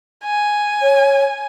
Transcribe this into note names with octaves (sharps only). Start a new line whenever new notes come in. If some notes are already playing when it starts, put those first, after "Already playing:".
G#5
C#5